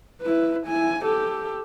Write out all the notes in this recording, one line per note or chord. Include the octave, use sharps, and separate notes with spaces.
E4 B4
E4 G#5
G4 A4